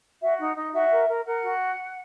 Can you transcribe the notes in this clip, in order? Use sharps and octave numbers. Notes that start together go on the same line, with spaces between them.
F#4 E5
D#4 F#5
D#4 D#5
F#4 E5
A#4
A#4
A#4 F#5
F#4